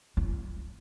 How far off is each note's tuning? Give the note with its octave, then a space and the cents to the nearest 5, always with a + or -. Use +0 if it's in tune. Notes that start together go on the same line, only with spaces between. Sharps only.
F4 -40